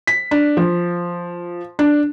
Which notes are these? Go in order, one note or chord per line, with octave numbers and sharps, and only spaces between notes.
B6
D4
F3
D4